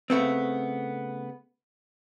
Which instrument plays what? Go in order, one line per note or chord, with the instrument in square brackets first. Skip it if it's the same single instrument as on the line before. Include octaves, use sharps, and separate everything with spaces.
[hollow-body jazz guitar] C#3 A3 B3 C4